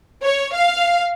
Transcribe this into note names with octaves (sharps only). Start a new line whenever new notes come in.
C#5
F5